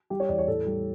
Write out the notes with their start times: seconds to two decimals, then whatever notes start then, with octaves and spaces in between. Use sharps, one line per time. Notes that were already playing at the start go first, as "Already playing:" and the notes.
0.10 G3 G4
0.20 C#5
0.29 E2 D5
0.38 C#5
0.48 A2 A4
0.66 G3